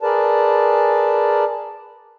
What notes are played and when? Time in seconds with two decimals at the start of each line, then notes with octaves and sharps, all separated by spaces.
0.02 G#4 A#4 B4 D5 A5